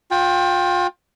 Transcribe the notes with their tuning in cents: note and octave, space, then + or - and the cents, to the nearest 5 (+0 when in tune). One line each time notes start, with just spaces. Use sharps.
F4 +30 G5 +5